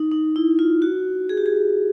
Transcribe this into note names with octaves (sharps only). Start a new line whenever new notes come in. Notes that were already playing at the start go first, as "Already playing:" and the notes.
Already playing: D#4
D#4
E4
F4
F#4
G#4
G4
G#4